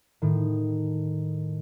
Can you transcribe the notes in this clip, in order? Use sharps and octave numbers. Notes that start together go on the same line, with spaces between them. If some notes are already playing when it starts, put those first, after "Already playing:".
A2 D#3